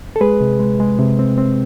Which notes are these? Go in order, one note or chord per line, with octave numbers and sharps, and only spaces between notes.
A4
G#3 G#4 B4
C3
G#3
G#3
C3
C4
C4